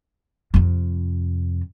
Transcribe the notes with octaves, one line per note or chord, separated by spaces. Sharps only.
F2 C3